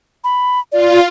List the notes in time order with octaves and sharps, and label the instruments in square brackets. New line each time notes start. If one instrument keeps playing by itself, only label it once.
[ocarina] B5
[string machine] F4 [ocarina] D5